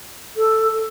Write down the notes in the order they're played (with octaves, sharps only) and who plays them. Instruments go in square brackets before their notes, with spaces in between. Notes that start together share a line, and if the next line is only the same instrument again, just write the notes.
[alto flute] A4